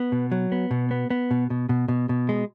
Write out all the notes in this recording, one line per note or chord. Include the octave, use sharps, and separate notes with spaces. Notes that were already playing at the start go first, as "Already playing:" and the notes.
Already playing: B3
B2
F#3
B3
B2
B3
B3
B2
B2
B2
B2
B2
G#3